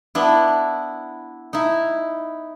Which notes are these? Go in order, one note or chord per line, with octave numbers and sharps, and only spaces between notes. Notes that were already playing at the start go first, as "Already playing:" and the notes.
B3 D4 E4
D#4 E4